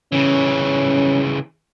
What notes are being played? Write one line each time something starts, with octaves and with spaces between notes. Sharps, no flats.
C#3 E3 C#4